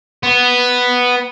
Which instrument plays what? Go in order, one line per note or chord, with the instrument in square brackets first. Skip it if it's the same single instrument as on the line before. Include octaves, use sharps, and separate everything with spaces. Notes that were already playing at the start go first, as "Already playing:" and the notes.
[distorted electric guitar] B3